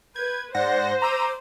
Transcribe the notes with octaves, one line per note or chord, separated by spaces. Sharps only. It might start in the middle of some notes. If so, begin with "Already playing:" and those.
B4 G6 G#6
G#2 C5 D5 F#5 A#6
A#5 D6 E6 D#7